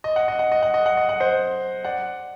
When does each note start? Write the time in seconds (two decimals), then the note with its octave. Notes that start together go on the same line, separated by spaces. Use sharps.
0.04 D#5
0.16 F#5
0.28 D#5
0.39 F#5
0.52 D#5
0.63 F#5
0.74 D#5
0.86 F#5
0.97 D#5
1.09 F#5
1.20 C5 D#5
1.85 D5 F#5